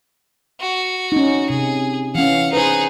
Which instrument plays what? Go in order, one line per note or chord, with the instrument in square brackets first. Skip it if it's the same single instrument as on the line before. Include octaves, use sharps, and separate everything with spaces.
[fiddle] F#4
[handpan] C#4 D#4
[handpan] C3 [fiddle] G#4
[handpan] E3 C#4 [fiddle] F5 F#5
[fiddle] D#4 G#4 [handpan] B4 C5